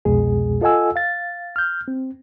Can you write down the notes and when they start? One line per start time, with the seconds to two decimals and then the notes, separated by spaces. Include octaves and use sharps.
0.05 C2 F2 B2 G#3 G#4
0.61 F4 A4 D#5 F#5 G#5 E6
0.96 F5 A6
1.56 F6 G6
1.88 C4